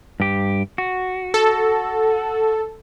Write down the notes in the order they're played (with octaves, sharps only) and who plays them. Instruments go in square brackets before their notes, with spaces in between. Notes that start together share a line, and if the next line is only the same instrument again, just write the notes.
[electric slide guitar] G2 G4
F#4
[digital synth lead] A4